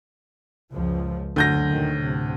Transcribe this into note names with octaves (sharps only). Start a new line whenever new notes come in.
C#2 F#2 F3
F#1 D2 F#3 G6 A#6
A#2 D#3 F#3
A2 C3